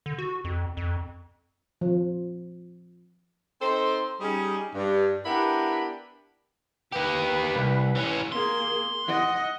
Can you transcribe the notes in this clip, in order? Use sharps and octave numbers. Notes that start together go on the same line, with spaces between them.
D3
F#4
F2
F2
F3
C4 D#4 A4 C5
G3 C#4 D#4 G#4
G2
B3 D4 E4 G4 A#4 B5
A#3 G4 B4
C2
E3 C#4
A#3 G#4 C6
D#5 F#5